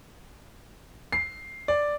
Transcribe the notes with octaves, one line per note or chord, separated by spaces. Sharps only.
C7
D5